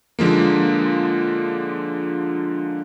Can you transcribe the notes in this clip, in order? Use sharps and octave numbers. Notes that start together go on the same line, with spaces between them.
D3 F3 G#3 A#3